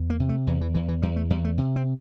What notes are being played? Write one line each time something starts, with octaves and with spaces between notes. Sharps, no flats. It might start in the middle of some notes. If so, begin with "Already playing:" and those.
Already playing: E2
A#3
C3
A3
E2 E3
E3
E2 E3
E3
E2 G3
A3
E2 G3
A3
C3
C4